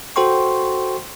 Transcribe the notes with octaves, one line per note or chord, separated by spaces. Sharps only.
F#4 A4 C5 G5 C6 C#6